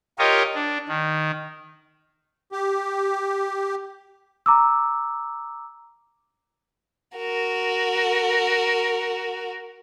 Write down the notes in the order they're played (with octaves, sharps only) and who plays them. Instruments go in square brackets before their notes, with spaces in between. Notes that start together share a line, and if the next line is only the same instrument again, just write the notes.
[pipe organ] F4 G4 A#4 C#5 D#5
D4
D#3
[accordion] G4
[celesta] A#5 D6 E6
[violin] F#4 A#4